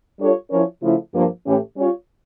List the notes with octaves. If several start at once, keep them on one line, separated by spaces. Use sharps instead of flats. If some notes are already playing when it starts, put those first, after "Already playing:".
G3 D4 F4 A4 C#5
F3 C#4 E4 A#4 C#5
C#3 F3 A3 E4
G2 F3 A#3
A2 E3 A3 C#4 G4
G3 C#4 F4 C#5